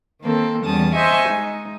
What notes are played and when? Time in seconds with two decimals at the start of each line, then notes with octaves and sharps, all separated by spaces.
0.21 D#3 A#3 C4 A4
0.65 E2 G3 C#4 A5 D#6
0.95 C5 D#5 E5 G#5 C#6
1.28 G#3 D#4